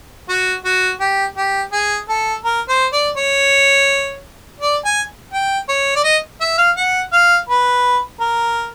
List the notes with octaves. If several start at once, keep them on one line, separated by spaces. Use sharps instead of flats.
F#4
F#4
G4
G4
G#4
A4
A#4
C5
D5
C#5
D5
G#5
G5
C#5
D5
D#5
E5
F5
F#5
F5
B4
A#4